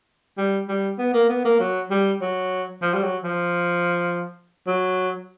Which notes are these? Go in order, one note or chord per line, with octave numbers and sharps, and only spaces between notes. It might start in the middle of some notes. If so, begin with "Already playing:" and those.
G3
G3
B3
A#3
B3
A#3
F#3
G3
F#3
F3
G3
F#3
F3
F#3